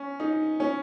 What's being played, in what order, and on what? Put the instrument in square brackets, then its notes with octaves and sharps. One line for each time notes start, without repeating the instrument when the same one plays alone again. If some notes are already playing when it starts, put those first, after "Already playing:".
Already playing: [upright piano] C#4
D#4
C#4